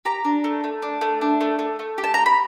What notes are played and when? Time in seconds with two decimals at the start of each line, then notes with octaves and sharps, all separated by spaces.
0.05 G4 A#5
0.25 D4
0.44 A3
0.64 A3
0.82 D4
1.01 A3
1.21 D4
1.41 A3
1.59 A3
1.79 A3
1.98 G4
2.04 A5
2.14 G4 A#5
2.26 B5